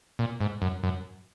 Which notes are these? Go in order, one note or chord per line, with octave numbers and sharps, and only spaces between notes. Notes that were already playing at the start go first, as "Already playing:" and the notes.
A#2
G#2
F#2
F#2